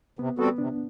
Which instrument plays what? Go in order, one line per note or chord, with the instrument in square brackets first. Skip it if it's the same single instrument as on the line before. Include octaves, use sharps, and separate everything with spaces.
[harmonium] C3 [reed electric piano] B3
[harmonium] G3 C4 F#4 A4 [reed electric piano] B3
[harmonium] C3 [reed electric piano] D4